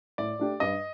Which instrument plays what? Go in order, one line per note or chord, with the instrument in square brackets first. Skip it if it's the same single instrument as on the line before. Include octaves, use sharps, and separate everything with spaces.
[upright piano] A2 [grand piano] D5
[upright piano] A3 D4 G4
[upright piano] G2 [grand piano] D#5